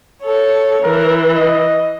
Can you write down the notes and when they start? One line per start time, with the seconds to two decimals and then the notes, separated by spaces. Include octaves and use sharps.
0.23 A4 C#5
0.83 E3 A#4
1.35 D#5